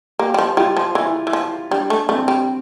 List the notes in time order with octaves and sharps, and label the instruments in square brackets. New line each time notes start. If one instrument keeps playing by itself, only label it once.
[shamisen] A#3 [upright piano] G4
[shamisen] G3
F3
[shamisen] G3 [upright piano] F4
[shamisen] F3
[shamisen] E3 [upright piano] E4
[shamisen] E3
F3
[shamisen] G3 [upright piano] D4
[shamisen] A3
[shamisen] A3 [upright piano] C4
[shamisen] G3